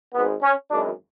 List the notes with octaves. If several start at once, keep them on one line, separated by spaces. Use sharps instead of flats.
G#1 G#2 G#3 B3
C#4
G#1 F#2 E3 G#3 D4